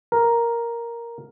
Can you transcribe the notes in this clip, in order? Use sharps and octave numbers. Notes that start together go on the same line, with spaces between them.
A#4